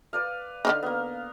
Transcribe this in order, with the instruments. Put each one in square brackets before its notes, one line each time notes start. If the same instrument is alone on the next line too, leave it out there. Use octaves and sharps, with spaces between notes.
[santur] B4 D5 F5
[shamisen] D3 D4 D#4 [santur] F5
[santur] A#3 B3